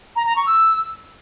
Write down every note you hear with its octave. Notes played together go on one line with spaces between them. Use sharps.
A#5
A#5
C#6
E6